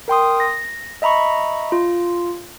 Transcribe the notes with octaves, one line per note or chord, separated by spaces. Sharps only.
A#4 G5 C6 D#6
A#6
D#5 E5 A#5 B5 C#6
F4